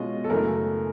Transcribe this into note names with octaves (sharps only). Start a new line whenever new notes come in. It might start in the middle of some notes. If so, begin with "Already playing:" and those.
Already playing: B2 G#3 C#4 F4 D#5
A4
F#2 C#3 E3 A3 A#4